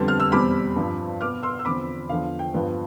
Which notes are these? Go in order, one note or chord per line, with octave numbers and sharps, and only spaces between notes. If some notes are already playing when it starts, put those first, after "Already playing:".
Already playing: F2 D3 G3 B3 A5 C6
F6
E6
E2 B2 G3 C4 B5 D6
G2 F3 C4
B2 B3 D6 F6
C6 E6
E6
E2 D3 F3 C4 B5 D6
E2 D3 F3 F5
G5
G2 F3 B3